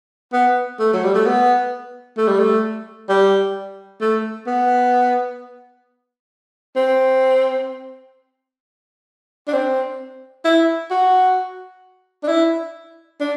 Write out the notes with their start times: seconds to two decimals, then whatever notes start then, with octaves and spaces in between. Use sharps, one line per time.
0.33 B3
0.79 A3
0.93 F#3
1.04 G3
1.15 A3
1.26 B3
2.17 A3
2.28 G3
2.40 A3
3.09 G3
4.01 A3
4.47 B3
6.76 C4
9.48 D4
9.53 C4
10.45 E4
10.90 F#4
12.23 D4
12.28 E4
13.21 D4